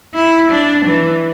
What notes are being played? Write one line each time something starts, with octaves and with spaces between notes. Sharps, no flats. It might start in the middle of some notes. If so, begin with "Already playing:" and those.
E4
D4
E3